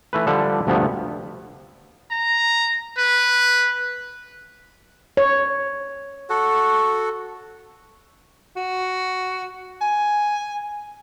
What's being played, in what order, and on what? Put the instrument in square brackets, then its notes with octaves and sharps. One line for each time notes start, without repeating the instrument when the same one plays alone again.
[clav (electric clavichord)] E3 A3 B4
D3 F3 G3 D4 A4
D2 G2 C3 F3 B3
[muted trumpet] A#5
B4
[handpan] C#5
[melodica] F#4 A4 F#5
[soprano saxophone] F#4
G#5